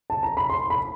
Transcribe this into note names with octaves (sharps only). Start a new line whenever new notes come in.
A5
A#5
B5
C6
B5